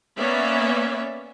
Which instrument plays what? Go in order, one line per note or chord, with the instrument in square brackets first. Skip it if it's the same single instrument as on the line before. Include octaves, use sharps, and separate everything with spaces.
[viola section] A#3 B3 C#4 C#5 D5 E5